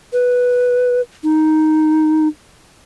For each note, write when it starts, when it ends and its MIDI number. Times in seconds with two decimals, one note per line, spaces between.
0.13 1.01 71
1.24 2.28 63